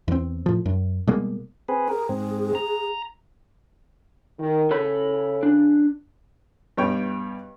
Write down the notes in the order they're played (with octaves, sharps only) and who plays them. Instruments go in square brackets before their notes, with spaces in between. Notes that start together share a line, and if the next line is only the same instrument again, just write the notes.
[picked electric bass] E2 C4
A2 F3
F#2
B2 G3 G#3 A#3
[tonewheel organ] C4 G#4 B4
[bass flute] G#4 [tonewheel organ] A#4
[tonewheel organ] G#2 C4
A#5
[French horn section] D#3
[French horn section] C#3 [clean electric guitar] A4 C#5 B5
[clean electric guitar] D4
[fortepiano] G2 B2 C#5 G5